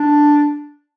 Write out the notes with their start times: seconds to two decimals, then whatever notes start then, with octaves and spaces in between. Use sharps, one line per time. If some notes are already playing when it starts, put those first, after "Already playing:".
Already playing: D4